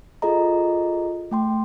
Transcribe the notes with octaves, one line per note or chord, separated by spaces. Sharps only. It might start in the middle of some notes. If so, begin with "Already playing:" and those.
F4 G#4 A4 D#5 A#5
A3 G5 C6